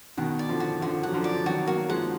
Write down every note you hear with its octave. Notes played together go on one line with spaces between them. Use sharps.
B2 D#3 F#5
D5
D3 F3
F#4
D3 F3 F#4
F#3 F#5
D3 F3
D5
D#3 F#3 F#4
F#3 A#3 F#4
F3 G#3 F#5